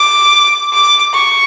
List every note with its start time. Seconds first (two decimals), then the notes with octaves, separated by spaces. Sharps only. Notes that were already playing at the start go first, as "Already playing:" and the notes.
Already playing: D6
0.73 D6
1.13 C#6